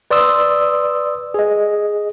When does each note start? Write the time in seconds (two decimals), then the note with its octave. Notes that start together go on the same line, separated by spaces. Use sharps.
0.11 B4 D5 C6 D#6 E6
1.34 G#4 D#5